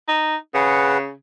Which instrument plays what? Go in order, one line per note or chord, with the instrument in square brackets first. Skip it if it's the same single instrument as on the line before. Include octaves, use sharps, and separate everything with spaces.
[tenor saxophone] D#4
[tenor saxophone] C#3 [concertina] G#4 B4 F#5